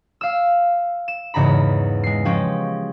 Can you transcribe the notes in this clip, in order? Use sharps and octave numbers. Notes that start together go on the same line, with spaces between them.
F5 E6
E7
E2 G#2 C#3 A#5 B5
G#3 C7
F3 G#3 C#4 G4